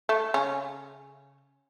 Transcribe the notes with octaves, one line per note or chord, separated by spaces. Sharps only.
A3
C#3 C#4